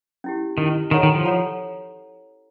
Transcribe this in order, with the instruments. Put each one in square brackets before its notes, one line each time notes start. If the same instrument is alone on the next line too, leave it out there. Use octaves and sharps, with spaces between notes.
[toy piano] C#4 E4 G4
[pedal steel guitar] D#3 [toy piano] C#4 E4 G4
[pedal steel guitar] D#3 [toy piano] A4 C#5 F#5 A#5
[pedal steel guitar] D#3
F3
[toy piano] A4 C#5 F#5 A#5